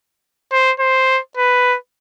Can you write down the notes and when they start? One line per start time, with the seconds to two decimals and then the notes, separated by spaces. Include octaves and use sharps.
0.52 C5
0.80 C5
1.37 B4